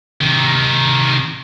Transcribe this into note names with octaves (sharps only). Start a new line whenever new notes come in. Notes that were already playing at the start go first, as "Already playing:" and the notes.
C3 D#3